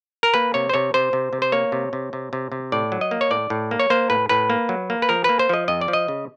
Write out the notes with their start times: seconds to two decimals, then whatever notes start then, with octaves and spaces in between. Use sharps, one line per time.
0.23 A#4
0.34 A#3 B4
0.54 C3 C#5
0.69 C5
0.74 C3 C#5
0.94 C3 C5
1.13 C3
1.33 C3
1.42 C5
1.52 A#3 C#5
1.72 C3
1.93 C3
2.13 C3
2.33 C3
2.52 C3
2.72 A2 D5
2.92 F#3
3.01 D#5
3.11 A#3
3.21 C#5
3.31 A2 D5
3.50 A2
3.71 A#3
3.80 C#5
3.90 A#3 C5
4.10 A2 B4
4.29 A2 B4
4.50 A#3
4.69 F#3
4.90 A#3
5.02 B4
5.09 F3 A#4
5.24 A#3 B4
5.39 C5
5.49 F3 D#5
5.68 F2 D#5
5.81 D5
5.88 F3
5.93 D#5
6.08 C#3